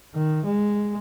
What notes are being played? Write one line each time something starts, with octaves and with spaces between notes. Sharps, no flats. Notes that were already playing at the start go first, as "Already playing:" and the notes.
D#3
G#3